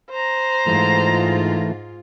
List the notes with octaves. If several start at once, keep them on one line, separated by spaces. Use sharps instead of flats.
C5 A#5
G#2 E3 A3 F4